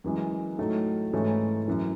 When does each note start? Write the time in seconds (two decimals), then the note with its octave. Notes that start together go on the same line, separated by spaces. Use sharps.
0.04 F#2 E3 G#3
0.58 A2 F#3 A3 D#4
1.13 G#2 E3 A3 C#4 E4
1.67 F#2 E3